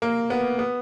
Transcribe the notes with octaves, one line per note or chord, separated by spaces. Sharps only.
A#3
B3
B3